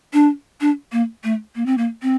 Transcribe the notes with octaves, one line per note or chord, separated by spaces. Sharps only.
D4
D4
A#3
A3
A#3
C4
A#3
C4